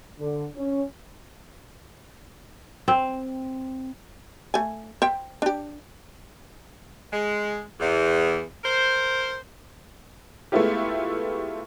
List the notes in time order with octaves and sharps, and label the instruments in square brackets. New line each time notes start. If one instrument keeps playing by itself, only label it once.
[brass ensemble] D3
C#4
[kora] C4
[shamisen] A3 G#5
C5 E5 G5
D4 G4
[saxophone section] G#3
E2
A#4 C5
[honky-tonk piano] G#3 A3 B3 E4 F4 G4